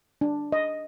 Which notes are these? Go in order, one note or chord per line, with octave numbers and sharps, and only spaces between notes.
D4
D#5